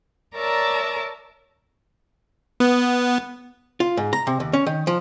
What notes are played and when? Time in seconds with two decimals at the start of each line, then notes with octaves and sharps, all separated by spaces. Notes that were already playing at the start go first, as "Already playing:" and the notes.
0.36 A#4 C#5 D5 E5 A5 A#5
2.60 B3
3.80 F4
3.97 G#2
4.13 A#5
4.27 C3
4.40 D#2
4.53 C#4
4.66 D#3
4.87 F3